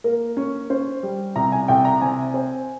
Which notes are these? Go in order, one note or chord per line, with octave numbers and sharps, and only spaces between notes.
A#3 A#4
C#4
C#4 C5
G3
C2 A#5
G#5
C2 G5
A#5
C3 G#5
C4